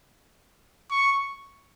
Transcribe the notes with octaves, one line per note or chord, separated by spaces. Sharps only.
C#6